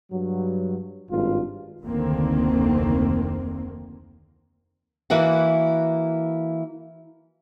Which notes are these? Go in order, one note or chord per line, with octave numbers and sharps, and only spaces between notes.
G2 F#3
G#1 G2 F4
F1 D2 D3 D#3 A#3 C4
E3 A#3 E4 F#4 F#5